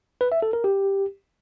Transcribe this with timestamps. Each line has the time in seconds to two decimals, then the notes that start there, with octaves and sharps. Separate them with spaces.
0.21 B4
0.32 E5
0.42 A4
0.53 A#4
0.64 G4